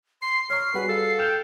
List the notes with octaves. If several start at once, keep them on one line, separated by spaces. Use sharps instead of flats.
C6 C7
C#5 A#5 C#6 F6
G3 F#4 G#4 B4
A4 F5
G5 F6 E7 F7